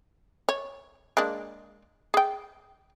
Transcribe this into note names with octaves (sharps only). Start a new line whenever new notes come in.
C#5
G#3 A#3 D4
G#4 G5